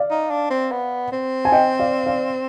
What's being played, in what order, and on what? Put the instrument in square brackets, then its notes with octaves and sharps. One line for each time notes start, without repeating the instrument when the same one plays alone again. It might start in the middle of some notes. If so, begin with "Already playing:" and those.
Already playing: [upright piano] D5 F5
[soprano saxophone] D#4
D4
C4
B3
C4
[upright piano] G#5
D#5 G5
D5 F5
D5 F5